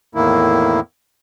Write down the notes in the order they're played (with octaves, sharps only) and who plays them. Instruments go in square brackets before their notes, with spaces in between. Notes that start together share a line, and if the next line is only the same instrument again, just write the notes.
[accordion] E2 A2 D#3 A#3 E4